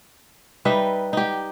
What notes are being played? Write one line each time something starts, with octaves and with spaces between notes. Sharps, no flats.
G3 D#4 B4 E5
D#4 G4